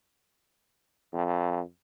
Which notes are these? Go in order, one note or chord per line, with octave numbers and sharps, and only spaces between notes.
F2